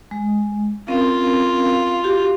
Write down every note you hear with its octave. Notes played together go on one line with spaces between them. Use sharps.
G#3
C4 C#4 F4 A#4
F#4 G4